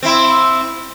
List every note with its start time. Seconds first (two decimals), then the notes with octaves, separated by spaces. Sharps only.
0.03 C4 E4